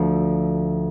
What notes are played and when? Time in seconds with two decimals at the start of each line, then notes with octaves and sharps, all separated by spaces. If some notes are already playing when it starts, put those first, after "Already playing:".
Already playing: D2 D3 F3